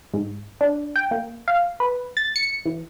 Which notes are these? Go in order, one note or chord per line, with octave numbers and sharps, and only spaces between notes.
G#2
D4
G5
A#3
F5
B4
A6
C#7
E3